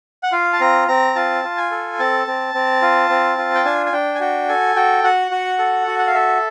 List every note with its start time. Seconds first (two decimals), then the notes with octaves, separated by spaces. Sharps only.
0.23 F#5
0.32 F4 F5
0.53 A5
0.61 C4 A#5
0.88 C4 A#5
1.15 F4 A5
1.44 F4
1.57 G#5
1.71 A4
1.99 C4 A5
2.27 C4
2.54 C4
2.82 F4
3.09 C4
3.38 F4
3.55 G5
3.65 D4 G#5
3.86 G#5
3.92 D4 G5
4.15 G#5
4.20 F#4 G5
4.49 A4 G#5
4.76 F#4 G5
5.04 F#4 F#5
5.31 F#4
5.59 A4
5.87 F#4
5.99 F#5
6.07 F5
6.14 A4 E5